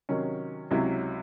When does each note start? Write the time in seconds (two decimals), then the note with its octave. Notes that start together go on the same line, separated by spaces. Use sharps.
0.09 C3 D#3 F#3 C#4
0.71 C#2 C3 F#3 C#4 E4